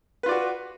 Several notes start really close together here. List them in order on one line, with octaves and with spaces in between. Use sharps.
B4 F4 D5 F#4